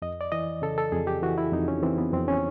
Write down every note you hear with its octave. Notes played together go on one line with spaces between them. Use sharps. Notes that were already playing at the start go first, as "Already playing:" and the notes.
F2 D#5
D5
E3 D#5
C#3 A4
A4
F2 G#4
G4
E3 F#4
E4
F2 D#4
C#4
E3 C4
B3
F2 C4
C#4